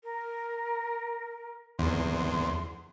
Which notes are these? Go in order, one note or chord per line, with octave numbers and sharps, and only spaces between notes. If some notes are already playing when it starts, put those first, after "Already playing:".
A#4
E2 C6